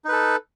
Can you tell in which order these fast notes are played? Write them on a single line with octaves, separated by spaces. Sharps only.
D#4 B4 A4